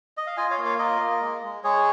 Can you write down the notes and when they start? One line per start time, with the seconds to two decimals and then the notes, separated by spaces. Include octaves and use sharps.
0.17 D#5
0.27 F5
0.37 F4 D#5 G#5
0.51 C#5 F5
0.58 A#3
0.65 C#5 F5
0.79 F4 A#4 D#5
1.01 A#3
1.21 G#3
1.44 G#3
1.64 G#3 G#4 C#5